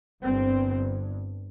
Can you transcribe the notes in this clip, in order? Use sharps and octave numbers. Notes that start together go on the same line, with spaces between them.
G1 G2 C4